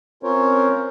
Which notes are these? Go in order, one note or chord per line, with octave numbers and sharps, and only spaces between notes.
C4 C#4 F4 A#4 C5 C#5